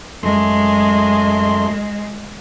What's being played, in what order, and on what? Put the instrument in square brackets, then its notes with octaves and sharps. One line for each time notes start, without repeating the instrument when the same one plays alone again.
[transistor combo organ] F#2 A3 C6 [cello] G#3